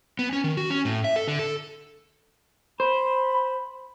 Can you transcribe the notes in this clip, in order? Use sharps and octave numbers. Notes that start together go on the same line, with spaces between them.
B3
C#4
D#3
F#4
C#4
A2
E5
A4
D3
A4
C5 B5